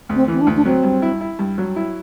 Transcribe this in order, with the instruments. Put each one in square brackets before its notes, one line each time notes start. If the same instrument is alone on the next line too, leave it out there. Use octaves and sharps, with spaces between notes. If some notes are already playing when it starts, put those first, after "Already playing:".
[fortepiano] D2
[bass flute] C4
[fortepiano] E3
[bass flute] C4
D4
[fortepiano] D2
[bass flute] D4
[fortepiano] F#3 [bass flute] C4
[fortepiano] G2
E4
E4
G2
F#3
E4